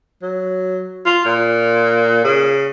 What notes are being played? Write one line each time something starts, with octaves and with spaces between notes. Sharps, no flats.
F#3
F4
A#2
C#3